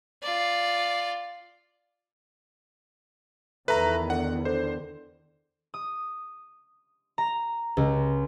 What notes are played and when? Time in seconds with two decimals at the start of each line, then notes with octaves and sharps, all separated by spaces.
0.23 F4 D5
3.68 E2 D#3 A3 B4 A#5
4.10 D3 F#5
4.45 D3 C5
5.74 D#6
7.18 A#5
7.77 C#2